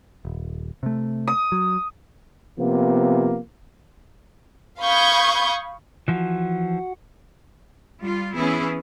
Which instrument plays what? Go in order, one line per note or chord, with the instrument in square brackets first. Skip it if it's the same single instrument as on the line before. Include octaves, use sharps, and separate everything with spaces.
[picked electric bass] D#1
C3 A3
[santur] D#6
[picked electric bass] F#3
[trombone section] C3 F3 A#3 B3
[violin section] F5 B5 C#6 D#6 G6 G#6
[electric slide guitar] E3 F3 [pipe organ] F#4 F#5
[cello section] G3 F4
E3 B3 C#4 E4 G#4